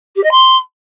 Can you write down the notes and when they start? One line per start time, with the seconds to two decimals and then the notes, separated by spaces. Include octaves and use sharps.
0.16 G4
0.23 D#5
0.31 C6